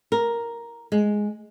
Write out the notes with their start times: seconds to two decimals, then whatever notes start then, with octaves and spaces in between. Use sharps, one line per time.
0.12 A#4
0.92 G#3